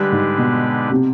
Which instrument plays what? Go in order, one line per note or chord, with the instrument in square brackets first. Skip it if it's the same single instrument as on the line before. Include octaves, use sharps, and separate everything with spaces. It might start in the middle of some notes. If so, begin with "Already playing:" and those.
Already playing: [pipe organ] D3 G#3 D4 G4 B4 [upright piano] G3
[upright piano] G#2
B2
C3